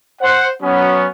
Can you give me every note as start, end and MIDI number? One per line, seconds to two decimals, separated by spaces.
0.21 0.46 72
0.21 0.46 78
0.63 1.06 54
0.63 1.06 59
0.63 1.06 61